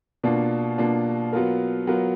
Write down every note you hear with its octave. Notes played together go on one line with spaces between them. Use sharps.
B2 A#3 D4 F4
B2 A#3 D4 F4
F#3 B3 F4 A#4
F#3 B3 F4 A#4